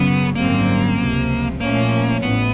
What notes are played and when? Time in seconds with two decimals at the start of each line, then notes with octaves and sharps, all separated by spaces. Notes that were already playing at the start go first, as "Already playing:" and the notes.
Already playing: F#2 C#3 F#3 B3
0.35 G#1 F#2 D3 G3 A#3 C4
0.98 C#2 C3 F3
1.60 A#2 F3 A3 A#3 C#4
2.22 A1 B3